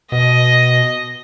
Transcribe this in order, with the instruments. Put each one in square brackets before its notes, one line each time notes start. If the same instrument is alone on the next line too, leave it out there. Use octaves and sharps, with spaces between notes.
[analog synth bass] B2 [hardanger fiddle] D#5